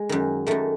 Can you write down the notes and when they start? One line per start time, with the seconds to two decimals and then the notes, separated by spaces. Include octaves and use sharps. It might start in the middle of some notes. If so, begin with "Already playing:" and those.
Already playing: G#3
0.09 F#2 D#3
0.47 F#2 D#3 A3